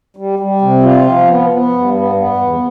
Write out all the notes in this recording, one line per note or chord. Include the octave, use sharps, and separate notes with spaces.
G3
G3
C3
F4
F3
B3
B3
G2
B3
B3
E2